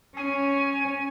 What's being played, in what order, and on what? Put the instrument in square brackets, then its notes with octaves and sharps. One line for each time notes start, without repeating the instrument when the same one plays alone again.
[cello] C#4 [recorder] G#5